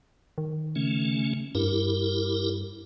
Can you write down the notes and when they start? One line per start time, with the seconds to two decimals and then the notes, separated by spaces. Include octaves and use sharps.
0.38 D#3
0.76 C#3 A3 C#4
1.55 G2 E4 G4 A#4